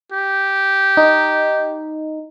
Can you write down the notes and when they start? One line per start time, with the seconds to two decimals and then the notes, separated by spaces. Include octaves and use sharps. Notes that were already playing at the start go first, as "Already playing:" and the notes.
0.12 G4
0.97 D#4